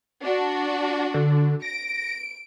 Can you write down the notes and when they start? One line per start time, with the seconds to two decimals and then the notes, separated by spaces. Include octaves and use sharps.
0.23 D4 F#4
1.14 D3
1.62 A#6 D7